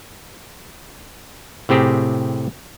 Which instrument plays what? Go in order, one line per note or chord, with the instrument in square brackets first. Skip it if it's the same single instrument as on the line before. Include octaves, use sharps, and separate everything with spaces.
[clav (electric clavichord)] A2 C3 C4 G4 G#4